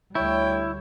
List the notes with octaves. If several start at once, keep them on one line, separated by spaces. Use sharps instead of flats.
D2 D3 G3 E4 C#5 G5